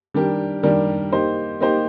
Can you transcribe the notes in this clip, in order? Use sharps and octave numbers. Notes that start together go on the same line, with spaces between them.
D#3 G3 D4 G4 A#4
D#3 G3 D4 G4 A#4
A#3 D#4 G4 C5
A#3 D#4 G4 C5